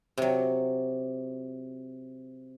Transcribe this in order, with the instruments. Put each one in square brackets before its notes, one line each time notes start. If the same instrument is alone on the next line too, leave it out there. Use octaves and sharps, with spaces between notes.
[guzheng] C3 F#3